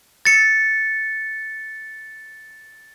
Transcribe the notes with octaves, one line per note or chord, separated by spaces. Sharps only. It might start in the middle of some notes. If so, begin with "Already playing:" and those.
A6 C#7